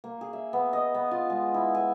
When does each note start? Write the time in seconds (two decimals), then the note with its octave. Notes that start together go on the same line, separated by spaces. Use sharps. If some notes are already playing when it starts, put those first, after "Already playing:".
0.04 A#3
0.21 G#4
0.33 E5
0.53 B3
0.73 D#5
0.94 B3
1.11 F4
1.30 G#3
1.54 E4
1.75 G#5